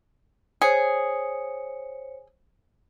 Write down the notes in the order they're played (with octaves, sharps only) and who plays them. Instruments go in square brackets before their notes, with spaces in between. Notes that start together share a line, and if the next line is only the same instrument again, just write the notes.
[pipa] G#4 [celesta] C5 C#5 C#7